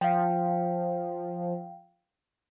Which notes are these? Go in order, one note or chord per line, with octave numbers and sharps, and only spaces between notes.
F3 F5 G5